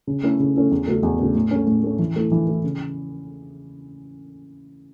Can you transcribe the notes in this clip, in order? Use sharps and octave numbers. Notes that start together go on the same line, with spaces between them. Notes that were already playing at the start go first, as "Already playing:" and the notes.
C#3
A3 C#4 E4 A4
C#3
A3 C#4 E4 A4
E2
C#3 A3 F#4 A4
E2
C#3 A3 F#4 A4
A2
A3 C#4
A2
A3 C#4
E3
A3 E4
E3
A3 E4
C#3